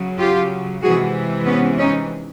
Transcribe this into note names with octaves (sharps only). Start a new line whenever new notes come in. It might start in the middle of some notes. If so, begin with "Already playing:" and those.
Already playing: C#3 F#3
F4 G4
C3 E3 G#3 F#4 G#4
B3 C#4
C#4 D#4